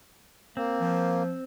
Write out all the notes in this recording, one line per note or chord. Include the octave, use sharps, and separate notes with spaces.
A#3 C4
F3